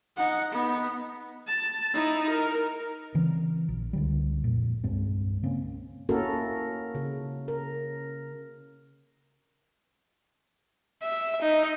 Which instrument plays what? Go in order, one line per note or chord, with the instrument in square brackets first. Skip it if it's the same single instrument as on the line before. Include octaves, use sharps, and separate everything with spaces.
[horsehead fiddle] D#4 F#5
B3 D#4
[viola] A5
D#4 E4
A#4
[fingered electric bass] C#3 E3 C4
A#1
C#2 D3 G3
F2 A#2
C2 G2 G#3 C4
C#3 A#3 C4 C#4
[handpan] A#3 C#4 E4 F#4 A4 A#4
C#3
A#4
[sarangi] E5
D#4